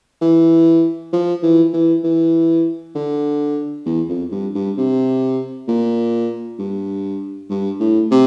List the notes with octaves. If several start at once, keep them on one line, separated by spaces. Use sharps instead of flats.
E3
F3
E3
E3
E3
D3
E2
F2
G2
G2
C3
A#2
G2
G2
A2
C3